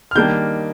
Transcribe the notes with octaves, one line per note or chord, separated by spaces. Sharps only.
F6
D#3 G3 A#3 D4 G6